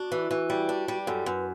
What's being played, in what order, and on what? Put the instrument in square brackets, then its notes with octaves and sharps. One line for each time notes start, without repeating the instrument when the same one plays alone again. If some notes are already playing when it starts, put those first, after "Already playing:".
Already playing: [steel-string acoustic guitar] D4 [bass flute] F#4
[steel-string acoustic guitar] E3
E3
G3
D4
G3
[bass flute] G4
[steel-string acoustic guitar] F#2 [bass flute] A4
[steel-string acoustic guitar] F#2 [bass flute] B4